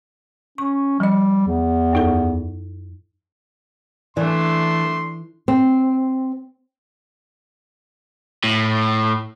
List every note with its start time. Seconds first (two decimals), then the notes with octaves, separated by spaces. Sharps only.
0.58 C#4 C#6
1.00 F3 G3 D#5
1.47 E2
1.93 F#2 D#4 A4
4.17 E3 A3 D4 D5 C6
5.48 C4
8.44 A2